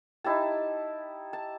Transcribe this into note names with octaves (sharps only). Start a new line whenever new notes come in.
D#4 E4 G4 A5
A5